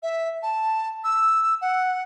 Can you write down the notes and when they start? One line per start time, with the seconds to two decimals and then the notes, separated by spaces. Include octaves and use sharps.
0.03 E5
0.43 A5
1.04 E6
1.62 F#5